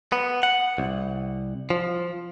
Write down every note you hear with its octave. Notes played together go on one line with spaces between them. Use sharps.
B3
F#5
C2
F3